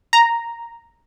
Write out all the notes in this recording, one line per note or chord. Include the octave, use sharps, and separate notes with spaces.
A#5